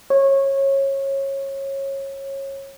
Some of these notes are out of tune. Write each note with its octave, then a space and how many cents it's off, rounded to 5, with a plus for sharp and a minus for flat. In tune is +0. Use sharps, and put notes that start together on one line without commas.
C#5 -20